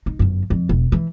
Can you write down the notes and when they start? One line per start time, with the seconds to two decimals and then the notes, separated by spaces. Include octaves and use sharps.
0.06 D#4
0.19 G1 F#2
0.50 F2
0.69 E1
0.92 E3